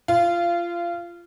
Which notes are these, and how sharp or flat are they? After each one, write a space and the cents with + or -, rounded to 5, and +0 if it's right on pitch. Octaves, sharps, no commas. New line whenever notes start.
F4 -20